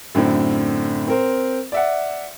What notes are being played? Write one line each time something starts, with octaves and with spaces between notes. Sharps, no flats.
F#2 A2 D3 C4
C4 A#4 C5
D5 E5 F#5